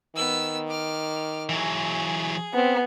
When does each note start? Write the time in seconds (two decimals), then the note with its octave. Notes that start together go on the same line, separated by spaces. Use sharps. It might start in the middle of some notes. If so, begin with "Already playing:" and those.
0.16 D#3 B3 E6
0.68 D6 F6
1.49 E3 F#3 G#4
2.54 B3 C4